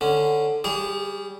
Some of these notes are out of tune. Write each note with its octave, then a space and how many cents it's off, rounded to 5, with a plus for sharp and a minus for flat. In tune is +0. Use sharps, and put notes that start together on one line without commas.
D3 +10 C#4 +0
G3 +0 G#4 -30 D5 -45